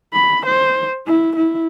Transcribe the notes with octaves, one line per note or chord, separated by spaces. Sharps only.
B5
C5
E4
E4